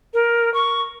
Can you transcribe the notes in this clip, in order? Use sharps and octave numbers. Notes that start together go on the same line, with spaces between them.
A#4
C#6